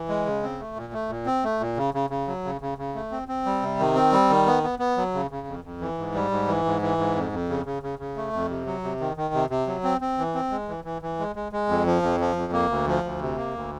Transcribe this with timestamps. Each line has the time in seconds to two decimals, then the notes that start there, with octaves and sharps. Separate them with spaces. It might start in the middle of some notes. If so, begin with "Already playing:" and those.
Already playing: E3
0.09 G#3
0.26 C#3
0.43 C4
0.60 A3
0.76 A#2
0.93 A3
1.09 A#2
1.26 C4
1.44 A3
1.60 A#2
1.77 C#3
1.94 C#3
2.10 C#3
2.27 F#3
2.44 C#3
2.61 C#3
2.78 C#3
2.95 A3
3.11 C4
3.28 C4
3.46 G3
3.62 C3
3.79 D#3
3.95 C4
4.12 G3
4.30 D#3
4.46 B3
4.63 B3
4.79 B3
4.97 F#3
5.14 C#3
5.31 C#3
5.47 F2
5.64 F2
5.81 E3
5.98 G#2
6.14 G3
6.31 G#2
6.47 E3
6.65 G#2
6.82 E3
6.98 G#2
7.15 F2
7.32 F2
7.49 C#3
7.65 C#3
7.83 C#3
7.99 C#3
8.16 A3
8.33 F2
8.49 C3
8.66 F#3
8.84 C3
9.00 D#3
9.17 D#3
9.34 C3
9.50 C3
9.67 F#3
9.84 C4
10.01 C4
10.18 E3
10.35 C4
10.51 G#3
10.68 E3
10.84 E3
11.02 E3
11.19 G#3
11.36 G#3
11.52 G#3
11.68 F2
11.86 F3
12.02 F2
12.20 F3
12.36 F2
12.53 A#3
12.70 D2
12.87 F3
13.03 D2
13.21 C3
13.37 A#3
13.54 D2